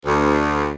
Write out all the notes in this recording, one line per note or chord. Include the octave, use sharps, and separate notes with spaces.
D2